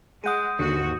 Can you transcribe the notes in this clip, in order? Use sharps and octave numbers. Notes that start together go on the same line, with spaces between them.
G#3 G#4 F#5 D#6 G6 D#7
D#2 G#2 D3 F#4